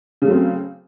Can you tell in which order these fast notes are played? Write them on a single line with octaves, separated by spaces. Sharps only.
C#3 A3 F#3 C4